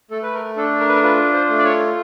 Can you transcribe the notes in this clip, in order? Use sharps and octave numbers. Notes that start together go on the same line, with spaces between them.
A3 A4
B4
A#4
D4 A4
A#4
B4
A#4
F4 B4
C5
A3
D5
C#5